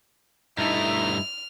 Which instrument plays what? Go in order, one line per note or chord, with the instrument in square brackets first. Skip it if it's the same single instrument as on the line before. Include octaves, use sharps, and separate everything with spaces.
[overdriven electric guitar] G2 A3 [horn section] D#4 E4 [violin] F6